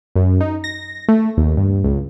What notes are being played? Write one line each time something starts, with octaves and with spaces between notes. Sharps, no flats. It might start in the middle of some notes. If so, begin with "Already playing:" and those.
F#2
D#4
A#6
A3
D#2
G2
C#2